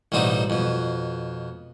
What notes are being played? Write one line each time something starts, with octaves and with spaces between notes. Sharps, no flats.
A1 B2 G3 C4 D#4 F#4
F2 B2